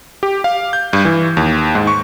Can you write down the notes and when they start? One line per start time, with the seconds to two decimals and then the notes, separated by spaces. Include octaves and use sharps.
0.23 G4
0.44 F5
0.73 G6
0.93 G2
1.05 E3
1.37 D#2
1.75 G#2
1.87 C#6